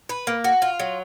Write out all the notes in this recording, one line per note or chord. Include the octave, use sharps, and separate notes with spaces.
B4
A#3
F#4
F4
F#3